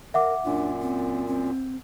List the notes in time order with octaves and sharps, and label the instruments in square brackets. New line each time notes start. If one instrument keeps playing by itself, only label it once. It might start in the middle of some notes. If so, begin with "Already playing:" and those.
[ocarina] A#4 [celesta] E5 F#5 D6
[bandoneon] F#2 A#2 [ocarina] D4
[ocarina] C4
C4